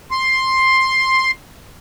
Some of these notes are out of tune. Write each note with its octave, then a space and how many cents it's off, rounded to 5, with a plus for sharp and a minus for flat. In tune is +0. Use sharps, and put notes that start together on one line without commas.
C6 +10